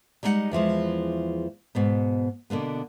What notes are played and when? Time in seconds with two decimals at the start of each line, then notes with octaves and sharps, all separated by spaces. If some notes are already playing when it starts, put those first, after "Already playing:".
0.23 G3 G#3 D#4 E4 F#5
0.52 E2 E3 F3 G#3
1.75 G#2 B2 B3
2.50 B2 D3 A#3 B3